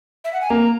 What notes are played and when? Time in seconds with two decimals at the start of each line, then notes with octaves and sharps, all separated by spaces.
0.24 E5
0.33 F#5
0.41 G#5
0.50 A#3 A#5